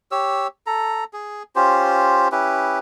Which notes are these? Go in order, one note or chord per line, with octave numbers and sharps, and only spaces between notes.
G4 C#5 E6
A4 A#5
G#4
C#4 F4 G4 C5
C#4 E4 G4 B4